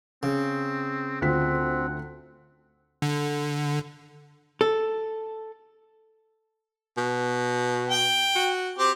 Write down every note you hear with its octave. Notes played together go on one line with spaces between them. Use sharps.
C#3 C4
D2 C4 F4 F#5 B6
D3
A4
B2
G5
F#4
C4 G4